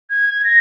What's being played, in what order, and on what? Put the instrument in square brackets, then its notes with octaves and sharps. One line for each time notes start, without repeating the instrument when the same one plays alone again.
[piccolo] G#6
A#6